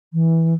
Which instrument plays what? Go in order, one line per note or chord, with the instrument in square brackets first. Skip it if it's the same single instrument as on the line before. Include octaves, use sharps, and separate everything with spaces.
[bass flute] E3